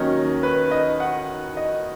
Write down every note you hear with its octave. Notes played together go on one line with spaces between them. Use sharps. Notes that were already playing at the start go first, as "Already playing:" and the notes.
Already playing: D#2 D#3 F#3 C#4 D#5
B4
D#5
F#5
D#5